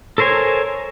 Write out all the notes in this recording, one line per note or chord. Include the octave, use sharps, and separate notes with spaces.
A4 A#4 C5 C#5 G#5